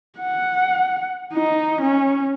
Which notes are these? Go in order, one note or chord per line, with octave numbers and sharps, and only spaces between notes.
F#5
D#4
C#4